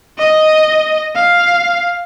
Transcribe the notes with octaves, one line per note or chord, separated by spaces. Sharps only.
D#5
F5